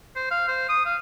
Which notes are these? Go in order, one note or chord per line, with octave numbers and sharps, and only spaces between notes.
C5
F5
C5
D#6
F5